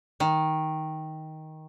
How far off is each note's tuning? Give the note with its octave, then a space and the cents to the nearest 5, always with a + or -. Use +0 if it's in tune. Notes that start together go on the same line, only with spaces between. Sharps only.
D#3 +10